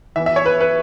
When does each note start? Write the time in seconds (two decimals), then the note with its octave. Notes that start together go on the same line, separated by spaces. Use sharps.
0.16 E3 B3 E5
0.26 E5
0.36 C#5
0.46 B4
0.61 B4